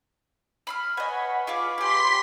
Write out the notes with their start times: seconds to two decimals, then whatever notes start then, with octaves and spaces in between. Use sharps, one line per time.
0.67 B5 C6 F6
0.97 B4 C#5 D#5 F#5 G#5 B5
1.47 F4 G#4 F5 D6
1.78 G4 G#4 C6 B6